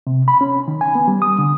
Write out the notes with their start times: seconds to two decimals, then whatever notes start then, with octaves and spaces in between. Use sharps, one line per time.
0.07 C3
0.28 B5
0.41 C#4
0.68 D#3
0.81 G#5
0.95 B3
1.08 G3
1.22 D#6
1.39 D3